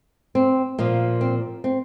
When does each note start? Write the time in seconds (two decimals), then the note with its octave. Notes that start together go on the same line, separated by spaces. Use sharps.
0.35 C4
0.79 A#2 F3
1.21 C4
1.64 C4